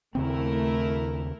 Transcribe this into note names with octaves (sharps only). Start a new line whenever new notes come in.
D#2 C#3 A3 C4 E4 A#4